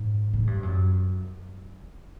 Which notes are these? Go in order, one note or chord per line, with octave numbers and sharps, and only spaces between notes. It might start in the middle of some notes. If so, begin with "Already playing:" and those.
Already playing: G#2
A2
G2
F#2